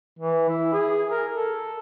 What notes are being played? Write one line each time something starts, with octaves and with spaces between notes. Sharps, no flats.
E3
E4
G#4
A#4
A4